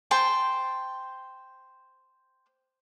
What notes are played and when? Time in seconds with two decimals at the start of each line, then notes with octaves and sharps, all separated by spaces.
0.11 C5 G5 A5